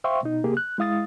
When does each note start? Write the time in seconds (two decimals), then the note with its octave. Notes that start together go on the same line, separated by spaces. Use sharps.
0.04 C5 E5 F5 G5 C6 C#6
0.23 B2 D#4
0.44 C3 A#3 G4 G#4
0.57 F#6
0.78 G#3 E4 F5 D#6 A6